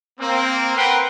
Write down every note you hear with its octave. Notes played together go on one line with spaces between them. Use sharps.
A#3 C4
A#4 B4 F#5 G5 C6